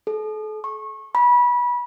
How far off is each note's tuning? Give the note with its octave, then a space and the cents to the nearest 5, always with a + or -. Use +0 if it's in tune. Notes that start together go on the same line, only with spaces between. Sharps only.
A4 -40
C#6 -25
B5 -25